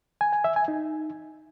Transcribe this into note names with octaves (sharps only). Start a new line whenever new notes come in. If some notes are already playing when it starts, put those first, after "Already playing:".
G#5
G#5
E5
G#5
D#4